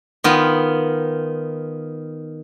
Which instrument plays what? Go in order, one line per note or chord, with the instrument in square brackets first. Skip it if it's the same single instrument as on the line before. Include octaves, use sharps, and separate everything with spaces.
[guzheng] D#3 B3 F4